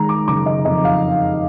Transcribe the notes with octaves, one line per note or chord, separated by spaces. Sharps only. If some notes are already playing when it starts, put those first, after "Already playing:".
Already playing: D#3 G#3 A#5
D6
F#1 D6
D#5
F2 D#5
F5